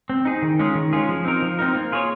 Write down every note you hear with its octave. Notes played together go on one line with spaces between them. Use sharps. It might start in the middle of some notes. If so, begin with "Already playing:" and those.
C4
D#4 G#4
D#3
G#3 C#4 F4 G#4
D#3
G#3 C#4 F4 G#4
F3
C4 D#4 A#4
F3
C4 D#4 A#4
A#3
F4 G#4 C#5